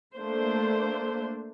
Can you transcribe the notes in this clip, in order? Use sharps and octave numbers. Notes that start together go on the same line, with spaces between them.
A3 A#3 D4 C5